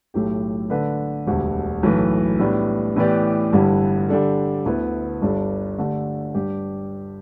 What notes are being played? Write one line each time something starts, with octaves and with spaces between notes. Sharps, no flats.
B1 A2 A3 G4
D3 A3 D4 B4
E1 D2 D3 G3
B1 A2 E3 A3
A2 G3 B3 D4
A2 E3 B3 G4 D5
G1 G2 D3 G3 E4
D3 G3 D4 A4
D2 D3 B3 E4
G1 G2 G3 D4 A4
D3 A3 D4 G4
G2 G3 D4 G4